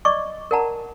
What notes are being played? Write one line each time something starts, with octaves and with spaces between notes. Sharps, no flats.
D5 D#5 C#6 D6
A#4 D5 F#5 A5 A#5